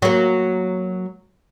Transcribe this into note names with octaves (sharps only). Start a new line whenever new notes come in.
F#3 A#3